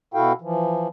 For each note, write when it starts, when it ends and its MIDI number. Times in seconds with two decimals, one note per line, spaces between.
0.14 0.32 47
0.14 0.32 64
0.14 0.32 66
0.14 0.32 69
0.14 0.32 77
0.14 0.32 79
0.42 0.88 52
0.42 0.88 53